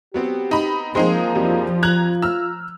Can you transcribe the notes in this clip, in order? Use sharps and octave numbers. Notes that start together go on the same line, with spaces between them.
F#3 B3 C4 G4
D#4 B5
F3 G#3 A#3 C4 D#4 G#4 C6
F2 F#3 G3
F4 A#5 F#6 G#6
A#5 E6 F6